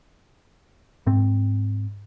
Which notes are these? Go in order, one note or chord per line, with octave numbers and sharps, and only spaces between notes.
G#2 C4